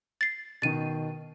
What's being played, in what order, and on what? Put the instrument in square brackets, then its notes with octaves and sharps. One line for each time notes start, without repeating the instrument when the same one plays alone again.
[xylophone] A6 C7
[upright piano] B2 D#3 [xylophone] A6 D#7